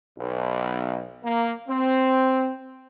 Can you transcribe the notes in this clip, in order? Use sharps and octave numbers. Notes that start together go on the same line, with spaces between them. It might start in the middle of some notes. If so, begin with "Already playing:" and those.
B1
A#3
C4